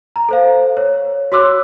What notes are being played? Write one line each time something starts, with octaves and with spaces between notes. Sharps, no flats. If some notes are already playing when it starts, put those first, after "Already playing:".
A#5
A4 C5 F5
C#5
F#4 C#5 C6 D6 E6 F#6